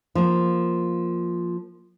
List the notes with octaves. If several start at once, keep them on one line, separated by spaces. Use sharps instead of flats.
F3 A#3